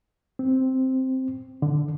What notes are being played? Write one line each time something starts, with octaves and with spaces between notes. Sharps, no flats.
C4
D3